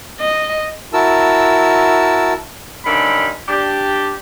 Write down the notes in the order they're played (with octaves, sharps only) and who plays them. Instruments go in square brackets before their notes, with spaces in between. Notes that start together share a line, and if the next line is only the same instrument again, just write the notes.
[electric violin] D#5
[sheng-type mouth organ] E4 F#4 A#4 A5 E6
[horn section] G2 D3 D#3 C#4 B5
D4 G4